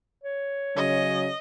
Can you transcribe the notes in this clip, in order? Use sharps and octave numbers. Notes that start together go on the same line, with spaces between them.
C#5
C#3 F#3 D#5